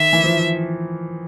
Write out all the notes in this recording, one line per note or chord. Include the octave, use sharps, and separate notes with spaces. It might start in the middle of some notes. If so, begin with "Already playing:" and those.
Already playing: D#3 E5
E3
F3